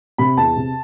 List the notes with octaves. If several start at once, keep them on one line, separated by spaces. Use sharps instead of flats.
C3 B5
E2 A5
C3